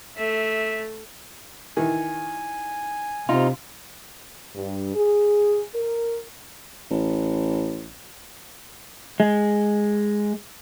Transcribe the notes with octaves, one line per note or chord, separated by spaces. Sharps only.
A3 E5
D#3 E3 G#5
C3 D#4 F4
G2
G#4
A#4
A1
G#3